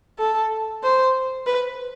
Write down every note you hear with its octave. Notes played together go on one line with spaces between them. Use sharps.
A4
C5
B4